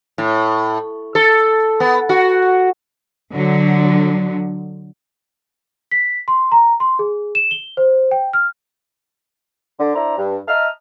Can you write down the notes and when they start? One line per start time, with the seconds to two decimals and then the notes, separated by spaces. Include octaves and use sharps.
0.18 A2
1.15 A4
1.80 B3
2.09 F#4
3.33 D3 F#3
5.91 B6
6.28 C6
6.52 A#5
6.80 C6
6.99 G#4
7.35 E7
7.51 G7
7.77 C5
8.11 G5
8.33 F6
9.79 D3
9.95 D4 E4 C5 D5 A#5
10.17 G2
10.47 D#5 E5 A5 A#5 F6